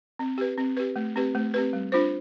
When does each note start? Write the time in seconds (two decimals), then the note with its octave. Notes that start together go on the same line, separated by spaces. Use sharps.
0.19 C4
0.38 G4 B4
0.57 C4
0.77 G4 B4
0.96 A3
1.16 C4 G4 B4
1.35 A3
1.54 C4 G4 B4
1.73 G3
1.92 D4 F4 C5